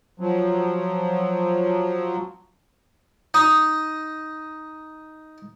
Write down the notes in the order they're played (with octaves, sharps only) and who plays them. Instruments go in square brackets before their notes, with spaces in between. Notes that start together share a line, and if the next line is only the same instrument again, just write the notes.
[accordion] F3 F#3
[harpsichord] D#4 D#5